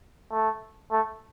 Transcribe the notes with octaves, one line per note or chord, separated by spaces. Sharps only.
A3
A3